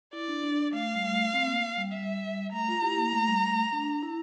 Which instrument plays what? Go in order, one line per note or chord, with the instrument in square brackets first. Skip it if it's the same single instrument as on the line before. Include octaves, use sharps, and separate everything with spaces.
[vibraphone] E4 [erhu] D5
[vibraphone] D4
D4
D4
[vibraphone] A3 [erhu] F5
[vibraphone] G3
A3
C4
A#3
G3
[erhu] E5
[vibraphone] A3 [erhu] A#5
[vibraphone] F4
E4 G4
A#3
A3
G3
A3
D4
E4